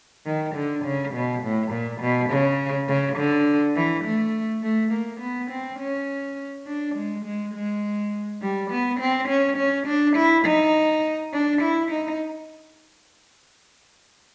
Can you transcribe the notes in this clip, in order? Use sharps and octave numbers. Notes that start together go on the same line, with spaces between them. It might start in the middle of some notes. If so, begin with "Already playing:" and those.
D#3
D3
C#3
B2
A2
A#2
B2
C#3
C#3
D3
E3
A3
A3
A#3
B3
C4
C#4
D4
G#3
G#3
G#3
G3
B3
C4
C#4
C#4
D4
E4
D#4
D4
E4
D#4